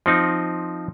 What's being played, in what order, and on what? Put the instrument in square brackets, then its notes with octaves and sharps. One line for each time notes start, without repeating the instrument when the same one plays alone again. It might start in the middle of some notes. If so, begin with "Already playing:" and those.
[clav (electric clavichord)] F3 C4 D#4